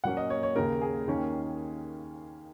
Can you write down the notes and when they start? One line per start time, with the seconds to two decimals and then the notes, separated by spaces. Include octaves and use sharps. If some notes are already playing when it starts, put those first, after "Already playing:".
0.04 A#2 F#3 A#3 C#4 F#5
0.17 D#5
0.30 C#5
0.43 C#5
0.55 D#2 C#3 A#3 A#4
0.82 G#4
1.08 D#2 D#3 A#3 C#4